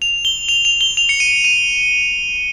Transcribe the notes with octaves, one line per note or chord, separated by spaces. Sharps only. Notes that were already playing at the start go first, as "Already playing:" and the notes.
F7
G7
F7
F7
G7
F7
C#7
D#7
D#7